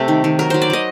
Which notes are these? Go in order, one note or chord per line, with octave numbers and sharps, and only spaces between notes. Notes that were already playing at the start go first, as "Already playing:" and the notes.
Already playing: C3 A3
D#3
D#3
F#3 A#4
F#3 C5
D5
F#3 D#5